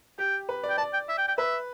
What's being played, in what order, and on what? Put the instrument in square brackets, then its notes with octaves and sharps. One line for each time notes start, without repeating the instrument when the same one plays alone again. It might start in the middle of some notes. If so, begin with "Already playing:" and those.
[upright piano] G4 [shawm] G5
[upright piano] B4
D5
[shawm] G5
[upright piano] D5 [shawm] A5
[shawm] G5
E5
G5
G5
[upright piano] B4 [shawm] E5